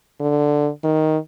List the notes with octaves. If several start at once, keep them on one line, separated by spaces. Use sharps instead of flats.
D3
D#3